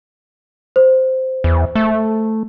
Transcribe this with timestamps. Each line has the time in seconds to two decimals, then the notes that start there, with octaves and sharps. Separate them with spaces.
0.76 C5
1.44 E2
1.75 A3